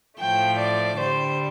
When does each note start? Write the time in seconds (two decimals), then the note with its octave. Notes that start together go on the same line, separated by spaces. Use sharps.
0.20 A2 F3 A3 G5
0.59 D5
0.99 D3 G3 C5